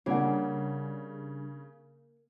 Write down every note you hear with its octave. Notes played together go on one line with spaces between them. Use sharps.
C#3 G3 A#3 D4 G#4 C#5 F#5